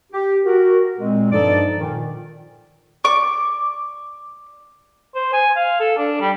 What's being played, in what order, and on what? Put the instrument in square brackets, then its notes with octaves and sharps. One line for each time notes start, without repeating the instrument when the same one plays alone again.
[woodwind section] G4
F#4 A#4
A#2 G#3 C4
G2 F3 D#4 A4 D5
A#2 D#3
[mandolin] D5 C#6 D6
[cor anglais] C5
G#5
F5
A4
D4
G3